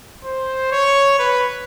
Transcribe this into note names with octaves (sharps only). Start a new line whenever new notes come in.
C5
C#5
B4